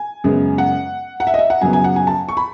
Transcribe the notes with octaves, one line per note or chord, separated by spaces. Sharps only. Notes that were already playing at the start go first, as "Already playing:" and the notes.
Already playing: G#5
F#2 C#3 G#3 B3
F#5
F#5
E5
D#5
E5
F#5
F#2 C#3 F#3 B3 G#5
G#5
F#5
G#5
A5
C#6
B5